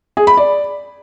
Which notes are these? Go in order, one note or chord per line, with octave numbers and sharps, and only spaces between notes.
G#4
B5
D5